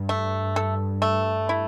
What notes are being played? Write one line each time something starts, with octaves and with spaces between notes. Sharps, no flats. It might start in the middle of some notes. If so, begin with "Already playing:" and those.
Already playing: G2
A3
A4
A3
E4